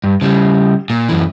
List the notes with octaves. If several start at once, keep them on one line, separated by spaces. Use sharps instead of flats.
G2
C#3 G3
A#2
F#2 E3